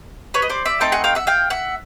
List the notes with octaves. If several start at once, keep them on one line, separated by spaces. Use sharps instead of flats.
B4 C#5
D#5
C5 D5
D5 E5
A3 C4 D#4 G5 A5
F#5 G#5
F5 G5
E5 F#5
F5 G5
E5 F#5